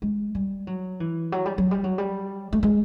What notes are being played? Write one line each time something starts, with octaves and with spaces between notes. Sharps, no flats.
G#3
G3
F#3
E3
F#3
G3
F#3
G3
F#3
G3
A3
G#3